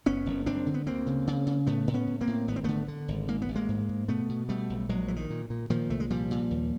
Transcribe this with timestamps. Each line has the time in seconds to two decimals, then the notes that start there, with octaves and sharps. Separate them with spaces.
0.06 F#1 B3 C#4
0.26 F#1
0.46 F#1 C4 D4
0.66 D3
0.74 B3
0.86 D2 A#3 C4
1.07 C#3
1.27 C#3
1.47 C#3
1.67 A2 A3 B3
1.87 A2
1.94 B3 C#4
2.07 A2
2.21 A#3 C4
2.27 A2
2.48 G#1 B3
2.56 C4
2.64 D3 A3 B3
2.88 D3
3.08 G#1
3.28 G#2 A#3
3.42 B3
3.48 A1
3.55 G#3 A#3
3.69 G#2
3.89 G#2
4.08 B2 A3 B3
4.29 B2
4.49 B2 G3 A3
4.70 B1
4.89 A#1 F#3 G#3
5.08 A#2 E3
5.16 D#3
5.30 A#2
5.50 A#2
5.70 A#2 D#3 F3
5.90 C2 A3
6.00 G#3
6.10 A#2 F3 G3
6.31 A#2
6.51 D#2